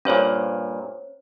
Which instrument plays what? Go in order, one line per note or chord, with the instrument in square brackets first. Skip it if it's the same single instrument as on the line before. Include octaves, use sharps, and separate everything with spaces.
[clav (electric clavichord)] G2 A#2 [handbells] C#4 C5 C#5